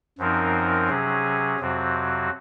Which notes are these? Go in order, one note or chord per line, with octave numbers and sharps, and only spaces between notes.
F#2 F3 C4 D#4 A#4
C3 F#3 C#4 G#4
F2 C3 F#3 C4 F#4